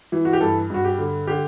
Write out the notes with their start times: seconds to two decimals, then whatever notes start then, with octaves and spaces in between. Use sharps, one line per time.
0.12 E3
0.25 F#4
0.33 G4
0.40 G2 A4
0.70 G2 F#4
0.85 G4
0.98 D3
1.27 D3 G4